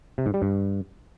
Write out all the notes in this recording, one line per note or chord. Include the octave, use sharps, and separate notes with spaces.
C3
G#2
G3
G2